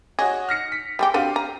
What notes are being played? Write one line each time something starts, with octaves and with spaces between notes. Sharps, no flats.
F#4 G#4 C#5 D#5
F6 A#6 C#7
B6
G3 G#3 G4
C4 D4 F#4 G4 F5 D#7
A#5